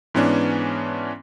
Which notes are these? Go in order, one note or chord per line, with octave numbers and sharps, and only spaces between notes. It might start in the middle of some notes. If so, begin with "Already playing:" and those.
G#2 E3 B3 C#4 D4